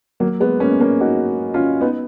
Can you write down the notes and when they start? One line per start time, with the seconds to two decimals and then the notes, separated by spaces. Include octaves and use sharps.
0.20 F#3 A#3
0.40 G#3 B3
0.60 A#3 C#4
0.80 A#3 C#4
1.00 D#4 F#4
1.54 C#4 F4
1.81 B3 D#4